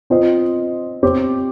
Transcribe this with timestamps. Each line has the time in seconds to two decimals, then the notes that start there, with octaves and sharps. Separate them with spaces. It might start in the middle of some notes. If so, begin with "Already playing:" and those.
0.10 C4 F4 C5 D#5
1.03 C4 G4 C#5